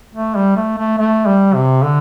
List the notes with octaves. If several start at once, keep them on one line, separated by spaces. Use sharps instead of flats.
A3
G3
A3
A3
A3
G3
C3
D3